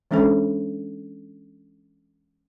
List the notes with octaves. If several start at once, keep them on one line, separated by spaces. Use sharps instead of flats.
E3 G#3 C#4 D4 A4 C5